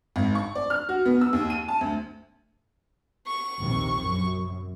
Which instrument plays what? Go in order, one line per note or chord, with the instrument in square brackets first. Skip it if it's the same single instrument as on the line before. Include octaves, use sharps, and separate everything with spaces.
[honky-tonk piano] G#1
C#6
D5
F6
F#4
B3
E6
D#2
D#7
A5
D2
[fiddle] C#6
[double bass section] A#1 D#2 C3
F#2